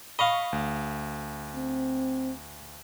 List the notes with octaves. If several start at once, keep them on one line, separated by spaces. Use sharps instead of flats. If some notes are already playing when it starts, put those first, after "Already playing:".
D#5 F5 B5 C#6
D2
C4